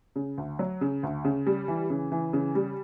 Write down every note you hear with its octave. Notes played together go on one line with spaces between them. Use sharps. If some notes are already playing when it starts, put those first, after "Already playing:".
C#3
D2
F#3
C#3
D2
C#3
G3
E3
C#3
E3
C#3
G3